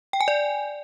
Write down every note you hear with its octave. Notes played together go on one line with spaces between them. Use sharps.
G5
G#5
D5